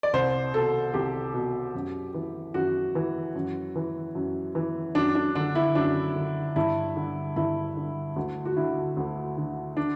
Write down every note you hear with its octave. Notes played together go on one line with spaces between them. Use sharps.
D5
C2 C5
B2 A4
C2 G4
B2
F#2
E3
F#2 F#4
E3
F#2
E3
F#2
E3
F#2 D4
D4
D3 D4
E4
F#2 D4
D3
G2 E4
D3
G2 E4
D3
D2
F#4
D3 E4
D2
D3
D4